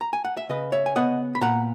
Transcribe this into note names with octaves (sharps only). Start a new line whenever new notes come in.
A#5
G#5
F#5
E5
C#3 B4 D#5
C#5 E5
G#5
B3 D#5 F#5
B5
A#2 F#5 A#5